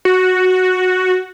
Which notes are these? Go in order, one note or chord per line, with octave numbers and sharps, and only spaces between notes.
F#4